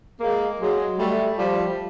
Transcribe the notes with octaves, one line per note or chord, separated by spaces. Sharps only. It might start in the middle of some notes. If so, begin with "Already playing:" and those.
G#3 A#3
F#3 G#3
G3 A3
F3 G3